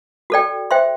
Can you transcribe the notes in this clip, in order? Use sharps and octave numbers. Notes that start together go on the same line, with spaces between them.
F#4 A4 D5 G5
C5 E5 G5 C6